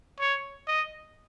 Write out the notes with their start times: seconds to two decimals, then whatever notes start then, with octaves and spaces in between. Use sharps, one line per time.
0.20 C#5
0.67 D#5